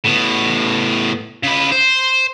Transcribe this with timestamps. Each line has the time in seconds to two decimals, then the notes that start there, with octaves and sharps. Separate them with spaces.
0.05 A2 B3
1.43 C#3 B4
1.72 C5